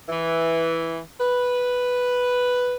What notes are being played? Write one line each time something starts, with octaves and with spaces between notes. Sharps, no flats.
E3
B4